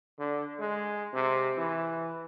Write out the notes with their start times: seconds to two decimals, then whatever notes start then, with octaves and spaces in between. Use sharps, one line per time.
0.19 D3
0.60 G#3
1.13 C3
1.58 E3